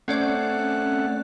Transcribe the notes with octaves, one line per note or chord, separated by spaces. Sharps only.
A3 C4 C#4 D5 F#5